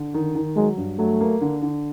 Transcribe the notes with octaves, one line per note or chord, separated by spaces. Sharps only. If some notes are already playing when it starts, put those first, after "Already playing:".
Already playing: D3
D#3
D#3
F#3 G#3
G2
F#3 A3
A#3
D3
D3